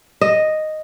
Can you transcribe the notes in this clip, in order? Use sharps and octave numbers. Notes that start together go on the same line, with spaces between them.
D#5